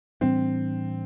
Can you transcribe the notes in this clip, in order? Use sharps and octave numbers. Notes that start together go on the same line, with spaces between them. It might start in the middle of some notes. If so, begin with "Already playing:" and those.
A2 E3 G3 C4 D4